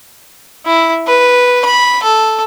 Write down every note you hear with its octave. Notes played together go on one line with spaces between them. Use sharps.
E4
B4
B5
A4